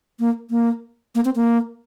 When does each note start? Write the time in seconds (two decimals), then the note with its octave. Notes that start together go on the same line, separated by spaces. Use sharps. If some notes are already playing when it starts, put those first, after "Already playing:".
0.20 A#3
0.50 A#3
1.15 A#3
1.25 C4
1.36 A#3